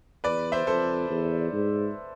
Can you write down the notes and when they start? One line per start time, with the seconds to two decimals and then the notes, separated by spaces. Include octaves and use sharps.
0.24 E2 B4 D5
0.52 C5 E5
0.67 F2 A4 C5
1.10 E2
1.52 G#2